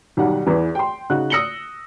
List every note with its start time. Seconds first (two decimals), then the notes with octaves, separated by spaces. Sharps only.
0.17 B1 D#3 G3 F#5
0.46 E2 E3
0.75 G5 C6
1.10 C#3 D#4 F#4 F#6
1.30 D#6 E6 A#6 C#7 F#7 G7